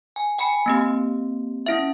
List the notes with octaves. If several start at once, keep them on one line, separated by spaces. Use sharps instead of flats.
G#5
G5 G#5 B5 C#7
A#3 C4 G4
C#4 E4 E5